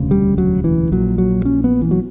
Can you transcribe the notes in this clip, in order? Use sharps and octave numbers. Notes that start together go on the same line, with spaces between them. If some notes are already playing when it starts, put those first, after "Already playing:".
Already playing: E1 D2 C#3
G3
F#3
E3
A#1 A#2 F#3
F#3
C#4
B3
E3
F#3